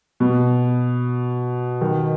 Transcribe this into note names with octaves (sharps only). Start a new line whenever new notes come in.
B2
D#3